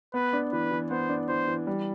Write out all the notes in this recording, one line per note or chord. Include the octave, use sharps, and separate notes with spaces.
B3 B4
D4
E3 B4
E3
B3 C5
D4
E3 C5
E3
G3